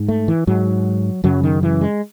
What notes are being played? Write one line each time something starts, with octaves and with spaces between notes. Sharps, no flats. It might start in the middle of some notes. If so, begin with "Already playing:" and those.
Already playing: G#2
A3
E3
G#2 F#3
F#2 C#3 F#3
D#3
E3
G#3